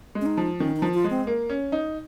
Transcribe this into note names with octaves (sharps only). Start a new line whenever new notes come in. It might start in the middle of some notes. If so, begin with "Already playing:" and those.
G#3
C#4
D#4
F3
D#3 C#4
D#4
F3
F4
G#3
C4
A#3
C#4
D#4